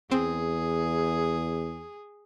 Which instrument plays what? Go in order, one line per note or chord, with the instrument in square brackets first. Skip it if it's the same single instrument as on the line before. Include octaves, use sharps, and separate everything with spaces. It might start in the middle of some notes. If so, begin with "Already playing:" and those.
[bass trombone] E2 [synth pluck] C4 [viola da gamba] G#4